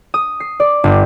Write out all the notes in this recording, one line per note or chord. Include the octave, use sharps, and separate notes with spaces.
D#6
C7
D5
G1